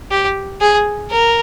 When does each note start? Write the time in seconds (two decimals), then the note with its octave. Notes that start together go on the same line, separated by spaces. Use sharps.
0.11 G4
0.61 G#4
1.10 A#4